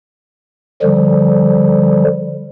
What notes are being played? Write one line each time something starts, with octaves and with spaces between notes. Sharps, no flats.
D3 F3 G3